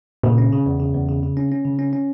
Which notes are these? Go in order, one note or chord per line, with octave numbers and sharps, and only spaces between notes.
A#2 C#3
C#4
C#3
E2
C#3
E2
C#3
C#3
C#4
C#4
C#3
C#4
C#4